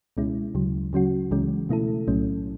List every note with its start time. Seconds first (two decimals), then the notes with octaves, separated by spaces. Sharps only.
0.17 C#2 B2 G#3 C#4 E4
0.54 D2 C#3 F#3
0.93 C#3 F#3 C#4 F#4
1.31 C#2 C#3 E3 G#3 C#4
1.69 B2 A3 E4 A4
2.07 B1 A2 F#3 A3 C#4